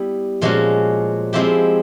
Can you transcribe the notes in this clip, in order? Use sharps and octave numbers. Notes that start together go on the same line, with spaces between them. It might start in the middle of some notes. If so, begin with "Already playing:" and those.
Already playing: G3 B3 E4 G4
A#2 F3 G#3 C#4 F#4
F3 G#3 C4 E4 G4